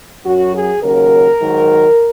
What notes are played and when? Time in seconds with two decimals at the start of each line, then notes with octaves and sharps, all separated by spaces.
0.25 F#2 F#3 F#4
0.54 G#4
0.83 D#2 C#3 F#3 A#4
1.39 G#2 D#3 F#3